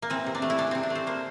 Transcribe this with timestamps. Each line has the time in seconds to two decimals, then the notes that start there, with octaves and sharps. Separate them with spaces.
0.02 A#3
0.10 E3 C4
0.27 C3
0.35 D4
0.42 A3
0.50 E4
0.58 E3 D4
0.71 C3 C4
0.83 D4
0.90 A3
0.95 C5
1.07 A#3 C5